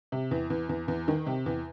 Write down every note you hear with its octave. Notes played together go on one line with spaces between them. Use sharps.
C3
E2
E2
E2
E2
D#3
C3
E2